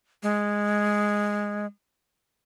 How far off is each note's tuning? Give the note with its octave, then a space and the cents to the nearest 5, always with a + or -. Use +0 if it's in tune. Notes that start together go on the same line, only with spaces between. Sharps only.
G#3 -5